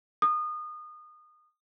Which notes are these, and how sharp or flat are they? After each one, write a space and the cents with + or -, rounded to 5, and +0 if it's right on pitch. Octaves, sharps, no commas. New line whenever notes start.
D#6 -25